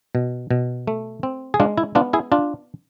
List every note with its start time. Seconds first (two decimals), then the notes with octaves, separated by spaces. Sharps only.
0.15 B2
0.51 B2
0.87 A3
1.23 C4
1.54 G#4
1.60 G#3 D4 F4
1.78 E4
1.95 B3 D4 F4
2.13 E4 G#4
2.32 D4 F4